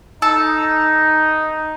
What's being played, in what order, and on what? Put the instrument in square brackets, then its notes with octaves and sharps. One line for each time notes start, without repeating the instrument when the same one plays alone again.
[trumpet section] D#4 [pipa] A4